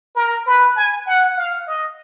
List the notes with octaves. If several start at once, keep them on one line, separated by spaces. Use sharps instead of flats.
A#4
B4
G#5
F#5
F5
D#5